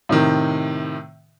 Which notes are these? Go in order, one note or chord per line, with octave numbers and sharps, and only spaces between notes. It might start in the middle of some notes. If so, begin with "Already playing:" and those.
A2 C3 D#3